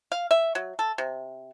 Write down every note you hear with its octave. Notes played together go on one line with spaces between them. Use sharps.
F5
E5
F#3
A4
C3